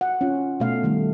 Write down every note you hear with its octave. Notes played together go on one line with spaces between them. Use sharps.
F#5
C#4 F4
B2 A3 F5
D#3 G3 A3